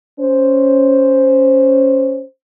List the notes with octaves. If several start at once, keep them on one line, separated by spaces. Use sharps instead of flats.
C#4 C5